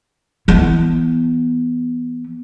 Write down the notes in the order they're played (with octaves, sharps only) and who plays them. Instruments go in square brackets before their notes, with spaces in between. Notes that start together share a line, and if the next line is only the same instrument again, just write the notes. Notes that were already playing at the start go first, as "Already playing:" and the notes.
[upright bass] E3 B3